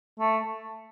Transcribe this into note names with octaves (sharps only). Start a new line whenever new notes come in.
A3